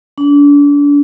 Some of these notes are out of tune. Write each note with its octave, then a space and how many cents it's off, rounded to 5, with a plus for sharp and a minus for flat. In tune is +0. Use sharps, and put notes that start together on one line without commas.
D4 -35